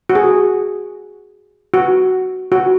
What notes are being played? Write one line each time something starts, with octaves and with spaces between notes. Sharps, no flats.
F#4
G#4
F#4
F#4